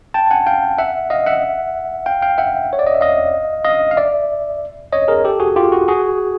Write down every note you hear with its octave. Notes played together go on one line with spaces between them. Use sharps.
G5 A5
F#5 G#5
F5 G5
E5 F#5
D#5 F5
E5 F#5
F5 G5
F5 G5
E5 F#5
C#5
D5
D#5
E5
D#5 F5
D#5 F5
F5
D5 E5
C#5 D#5
G#4 A#4
G4 A4
F#4 G#4
F4 G4
F#4
F#4 G#4